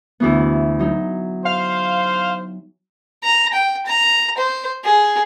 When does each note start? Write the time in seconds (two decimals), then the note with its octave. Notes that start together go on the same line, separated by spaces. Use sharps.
0.20 D2 E3 B3
0.79 F#3 D#4
1.45 C5 F5
3.24 A#5
3.53 G5
3.86 A#5
4.38 C5
4.85 G#4